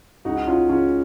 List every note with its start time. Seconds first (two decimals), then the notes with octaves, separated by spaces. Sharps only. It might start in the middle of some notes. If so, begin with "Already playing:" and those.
0.25 C#2 D#4 F#4
0.47 C#4 F4
0.69 C#3 C#4 F4